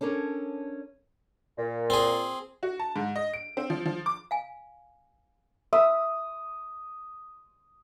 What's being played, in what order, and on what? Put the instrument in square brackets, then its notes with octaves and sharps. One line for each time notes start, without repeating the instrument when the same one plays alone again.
[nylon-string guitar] C#4 D4 A4 A#4 C#5
[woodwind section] A#2
[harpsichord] C4 G#4
[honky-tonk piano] F#4
A5
G#2
D#5
D7
C4
F3
F3
D6
[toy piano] F5 G#5
[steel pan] E5 [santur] D#6